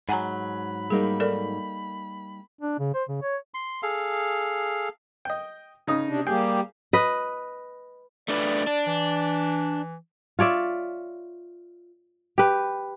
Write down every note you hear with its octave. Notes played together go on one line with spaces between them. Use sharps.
G#2 F#3 F#5 G#5 A#5 B5
G3 A#3 D#4 G#4
A4 A#4 D5
D4
C#3
C5
C#3
C#5
C6
G#4 A4 F5
D#5 G5
C#3 D#4 D#6
C3 D4
G3 A#3 G4 G#4 G5
B4 D#5
A3 D4 B4 D5
D4
E3
F4 C#5 D5 E5
G4 B4